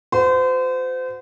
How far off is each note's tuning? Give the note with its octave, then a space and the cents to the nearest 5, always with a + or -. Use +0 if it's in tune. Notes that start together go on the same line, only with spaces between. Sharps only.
F#4 -30 C5 -35